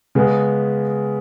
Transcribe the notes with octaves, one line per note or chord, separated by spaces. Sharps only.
C#3 G#3 B3